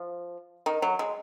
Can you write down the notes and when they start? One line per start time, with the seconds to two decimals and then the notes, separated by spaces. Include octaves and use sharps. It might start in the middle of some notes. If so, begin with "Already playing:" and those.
Already playing: F3
0.66 D#3
0.82 F#3
0.99 G#3